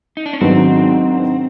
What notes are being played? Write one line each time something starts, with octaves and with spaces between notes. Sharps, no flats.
D#4
D4
C#4
G#2 D#3 F#3 B3 C4 D4